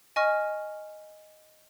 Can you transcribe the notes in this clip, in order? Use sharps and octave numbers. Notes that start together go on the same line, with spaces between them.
D#5 G#5 C#6 F6